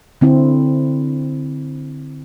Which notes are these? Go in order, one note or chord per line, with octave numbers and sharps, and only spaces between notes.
D3 C4 E4